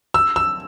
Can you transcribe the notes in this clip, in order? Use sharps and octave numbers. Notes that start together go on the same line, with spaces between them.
E6
E6